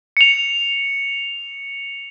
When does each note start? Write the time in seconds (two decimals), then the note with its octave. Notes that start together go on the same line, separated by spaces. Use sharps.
0.17 C#7 F7